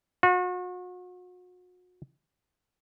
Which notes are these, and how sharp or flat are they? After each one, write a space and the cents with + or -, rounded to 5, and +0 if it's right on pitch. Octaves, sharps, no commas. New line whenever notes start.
F#4 -40